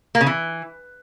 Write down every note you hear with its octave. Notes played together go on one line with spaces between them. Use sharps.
A#3
C#3
E3